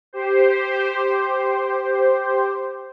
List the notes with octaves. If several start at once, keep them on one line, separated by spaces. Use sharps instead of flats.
G4 C5